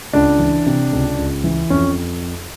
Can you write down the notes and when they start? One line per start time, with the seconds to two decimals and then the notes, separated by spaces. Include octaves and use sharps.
0.13 C#2 D4
0.39 E3
0.66 C3
0.92 C#2
1.18 C#2
1.44 E3
1.70 F2 C#4